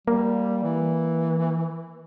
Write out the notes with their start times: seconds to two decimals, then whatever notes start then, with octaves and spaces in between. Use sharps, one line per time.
0.08 G3 A#3
0.63 E3